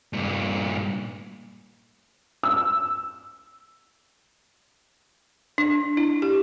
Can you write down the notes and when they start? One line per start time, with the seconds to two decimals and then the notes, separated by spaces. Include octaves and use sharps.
0.13 G2 A#2
2.43 E6
5.58 D4
5.97 E4
6.22 G4